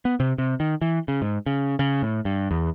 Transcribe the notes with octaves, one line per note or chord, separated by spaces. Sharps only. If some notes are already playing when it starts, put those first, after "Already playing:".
B3
C3
C3
D#3
E3
C#3
G#2
C#3
C#3
A2
G2
E2